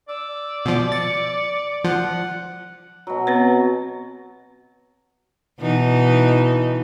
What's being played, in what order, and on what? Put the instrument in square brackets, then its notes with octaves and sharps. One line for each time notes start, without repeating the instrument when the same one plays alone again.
[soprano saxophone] D5 [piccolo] E6
[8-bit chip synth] B2 F3 [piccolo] E6
[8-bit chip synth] A6 [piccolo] C#7
[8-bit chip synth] F3 [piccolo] F#5
[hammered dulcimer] B2 F#3
[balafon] B3 C4 B4
[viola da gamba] B2 E3 D#4